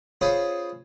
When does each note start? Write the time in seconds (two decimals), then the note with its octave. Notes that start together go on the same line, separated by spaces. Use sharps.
0.21 C#4 F4 G#4 C5 C#5 B5